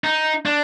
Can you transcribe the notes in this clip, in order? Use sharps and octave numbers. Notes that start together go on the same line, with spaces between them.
D#4
D4